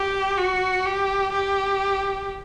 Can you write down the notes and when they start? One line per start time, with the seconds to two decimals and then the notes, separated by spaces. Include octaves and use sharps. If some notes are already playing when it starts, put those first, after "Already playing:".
Already playing: G4
0.37 F#4
0.86 G4
1.32 G4